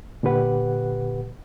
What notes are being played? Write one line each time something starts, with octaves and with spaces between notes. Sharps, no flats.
A#2 D3 G4 B4 F#5